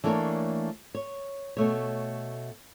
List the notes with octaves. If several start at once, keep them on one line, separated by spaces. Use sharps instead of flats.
E3 A3 A#3 D4 A#4 C#5
C#5
B2 A3 C#5